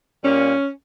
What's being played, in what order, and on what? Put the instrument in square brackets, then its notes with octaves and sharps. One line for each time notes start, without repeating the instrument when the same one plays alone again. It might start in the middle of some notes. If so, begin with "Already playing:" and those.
[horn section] A#2 G3 A#3 C#4